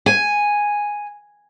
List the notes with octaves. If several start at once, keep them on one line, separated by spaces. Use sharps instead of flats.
G#5